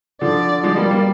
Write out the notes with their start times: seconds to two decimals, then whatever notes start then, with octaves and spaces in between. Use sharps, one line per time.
0.21 D3 F3 D5
0.63 F3 G#3 D5
0.77 G3 A#3
0.91 G3 A#3